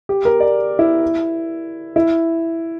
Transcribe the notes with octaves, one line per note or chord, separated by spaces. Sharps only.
G4
A#4
D5
E4
E4